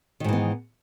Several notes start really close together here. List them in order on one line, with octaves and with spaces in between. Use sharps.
D#3 G#2 E3 B3